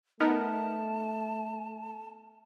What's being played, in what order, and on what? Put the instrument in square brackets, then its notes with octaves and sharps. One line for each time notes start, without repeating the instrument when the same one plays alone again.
[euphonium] A3 [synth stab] B3 D#4 A#4 [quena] A5